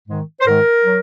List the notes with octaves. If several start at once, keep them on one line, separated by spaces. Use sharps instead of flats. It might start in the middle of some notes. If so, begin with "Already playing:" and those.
G#2 D#3 G#3
C5
G#2 D#3 G#3 A#4
F#3